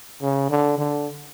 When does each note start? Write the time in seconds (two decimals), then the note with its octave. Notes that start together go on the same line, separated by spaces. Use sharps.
0.22 C#3
0.50 D3
0.78 D3